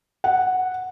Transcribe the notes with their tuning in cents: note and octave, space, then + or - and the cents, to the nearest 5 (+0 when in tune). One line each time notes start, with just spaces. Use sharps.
F#5 -5